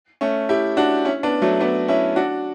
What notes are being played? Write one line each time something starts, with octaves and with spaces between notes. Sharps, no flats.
A3 C#4
E4 G4
D4 F#4
C#4 E4
B3 D4
F#3 A3
B3 D4
C#4 E4
D4 F#4